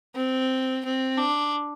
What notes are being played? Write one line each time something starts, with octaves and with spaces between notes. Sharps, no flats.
C4
C4
D4